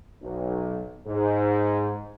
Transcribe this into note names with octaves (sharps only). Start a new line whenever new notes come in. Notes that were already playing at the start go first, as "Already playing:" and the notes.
B1
G#2